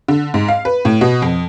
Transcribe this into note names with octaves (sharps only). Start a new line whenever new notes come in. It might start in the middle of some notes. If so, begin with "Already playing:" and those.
D3
G#2
F5
B4
A2
B2
F2